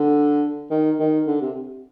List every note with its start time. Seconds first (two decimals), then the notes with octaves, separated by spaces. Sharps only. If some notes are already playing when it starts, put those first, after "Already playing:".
Already playing: D3
0.70 D#3
0.99 D#3
1.27 D3
1.41 C3